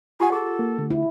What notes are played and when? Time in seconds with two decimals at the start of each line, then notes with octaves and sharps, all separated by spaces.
0.20 F4 G4 F#5 G#5
0.32 G#4 A4
0.59 A#3
0.78 D3 A3
0.90 E4